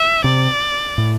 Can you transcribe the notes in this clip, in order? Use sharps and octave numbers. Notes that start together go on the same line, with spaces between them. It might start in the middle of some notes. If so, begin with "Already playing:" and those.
Already playing: E5
C3 D5
A2